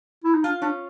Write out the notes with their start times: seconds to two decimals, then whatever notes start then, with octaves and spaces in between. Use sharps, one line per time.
0.24 E4
0.35 D#4
0.43 D4 F4
0.62 C#4 D4